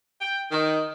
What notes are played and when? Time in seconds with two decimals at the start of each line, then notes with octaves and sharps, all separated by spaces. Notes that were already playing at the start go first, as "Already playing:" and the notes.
0.22 G5
0.52 D#3